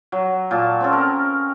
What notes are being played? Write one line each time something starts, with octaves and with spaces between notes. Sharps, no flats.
F#3
A#2 A5
C4 C#4 A4
A#4